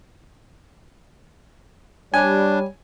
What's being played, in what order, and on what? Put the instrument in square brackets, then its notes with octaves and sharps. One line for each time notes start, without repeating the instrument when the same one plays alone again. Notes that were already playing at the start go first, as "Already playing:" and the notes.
[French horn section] G3 C#5 [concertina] D4 [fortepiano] G#5